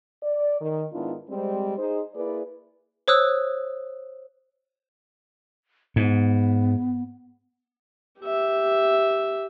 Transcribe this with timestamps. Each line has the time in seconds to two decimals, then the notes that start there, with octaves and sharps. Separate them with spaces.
0.23 D5
0.61 D#3
0.93 G#2 D#3 B3 D4 E4 F4
1.28 G3 G#3 C4
1.78 D#4 G#4 C5
2.14 A#3 E4 G#4 B4 D5
3.08 C5 C#5 D#6 E6 F#6
5.96 G#2 B3
8.20 G4 E5